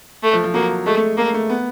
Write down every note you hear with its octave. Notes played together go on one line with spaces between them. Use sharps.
A3
F3
F3
F#3 A#3
G#3 A3
A3
A3 A#3
A3
B3